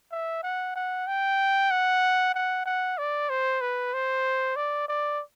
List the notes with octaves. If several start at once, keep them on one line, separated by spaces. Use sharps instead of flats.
E5
F#5
F#5
G5
F#5
F#5
F#5
D5
C5
B4
C5
D5
D5